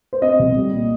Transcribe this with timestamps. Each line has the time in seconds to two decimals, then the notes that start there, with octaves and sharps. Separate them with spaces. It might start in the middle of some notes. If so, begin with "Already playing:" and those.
0.13 C5
0.22 C4 D#5
0.39 C2
0.57 G3
0.73 A#2